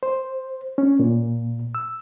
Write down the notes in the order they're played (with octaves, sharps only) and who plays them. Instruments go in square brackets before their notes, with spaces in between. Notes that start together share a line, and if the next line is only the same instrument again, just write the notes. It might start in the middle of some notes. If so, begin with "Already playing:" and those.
[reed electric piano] C5
C#4
A#2
E6